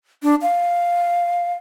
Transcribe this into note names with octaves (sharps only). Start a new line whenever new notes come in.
D4
F5